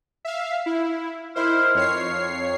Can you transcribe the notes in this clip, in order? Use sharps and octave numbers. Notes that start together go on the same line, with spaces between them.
E5 F5
E4
D#3 E4 C5 C6 F6
F2 C#5 C7